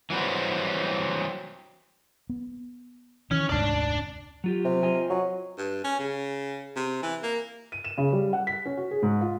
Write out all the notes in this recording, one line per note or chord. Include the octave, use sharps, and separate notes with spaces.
E3 F#3 G3 C4
B3
D#3 E3 C#4
F1 D2 G#2 D4 D5
F#3 F4 G4
C3
F4 D#5 G#5
F#3
G2
C#4
C#3
C3
E3
A#3
D#7
E7
C#3
G3
F#5
B6
C#4
F#4
G#4
G#2
F4